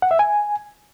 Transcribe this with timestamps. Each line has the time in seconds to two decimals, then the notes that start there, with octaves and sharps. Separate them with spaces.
0.02 F#5
0.11 E5
0.19 G#5